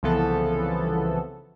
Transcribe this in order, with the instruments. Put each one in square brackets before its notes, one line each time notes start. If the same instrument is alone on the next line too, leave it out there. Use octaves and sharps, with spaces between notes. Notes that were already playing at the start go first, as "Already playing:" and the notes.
[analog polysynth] C2 C#3 E3 F3 B3 A4